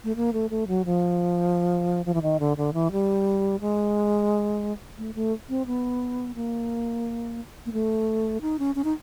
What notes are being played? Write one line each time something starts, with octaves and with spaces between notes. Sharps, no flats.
A3
A#3
A3
A3
F#3
F3
F3
E3
D#3
D3
D3
E3
G3
G#3
A3
A3
C4
B3
A#3
A#3
A3
D#4
C#4
C#4
D#4